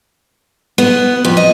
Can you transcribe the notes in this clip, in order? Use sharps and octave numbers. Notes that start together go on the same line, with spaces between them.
B3
F2
D#5